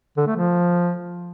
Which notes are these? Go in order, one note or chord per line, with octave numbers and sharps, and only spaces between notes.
D3
A3
F3